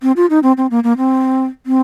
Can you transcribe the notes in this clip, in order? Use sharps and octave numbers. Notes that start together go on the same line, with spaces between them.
C4
F4
D#4
C4
C4
A#3
A#3
C4
C4